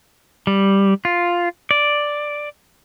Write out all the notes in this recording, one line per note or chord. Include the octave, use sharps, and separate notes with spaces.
G3
F4
D5